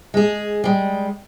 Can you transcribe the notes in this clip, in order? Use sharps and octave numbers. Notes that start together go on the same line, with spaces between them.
G#3 G#4
G3 G#3